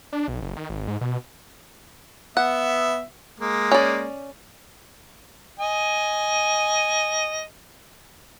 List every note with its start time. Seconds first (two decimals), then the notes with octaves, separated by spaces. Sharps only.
0.13 D4
0.28 B1
0.41 F#1
0.56 D#3
0.69 G#1
0.88 G#2
1.01 B2
2.37 B3 E5 F#5
3.40 G#3 A#3
3.71 C#4 D5
5.59 D#5 G#5